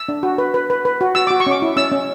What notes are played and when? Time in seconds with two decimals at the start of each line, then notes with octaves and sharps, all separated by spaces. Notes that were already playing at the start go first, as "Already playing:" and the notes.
Already playing: E6
0.09 D4
0.23 F#4
0.38 B4
0.54 B4
0.70 B4
0.85 B4
1.01 F#4
1.15 F#4 E6
1.27 F#4 D6
1.40 C#6
1.47 C#4 D6
1.62 E4
1.76 C#4 E6
1.92 C#4